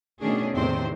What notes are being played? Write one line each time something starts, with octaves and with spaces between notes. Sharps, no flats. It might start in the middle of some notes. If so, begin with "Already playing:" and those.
B2 D#3 A3 C#4 D4 G#4
E2 A2 C3 D#3 C4 C5